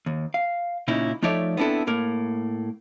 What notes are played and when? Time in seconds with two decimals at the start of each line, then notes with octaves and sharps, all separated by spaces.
0.06 D#2
0.34 F5
0.88 A#2 C#3 C#4 D#4 E4
1.22 F3 A3 D#4 C#5 D5 E5
1.57 B3 C4 D4 E4 A4
1.87 A2 A#3 A#4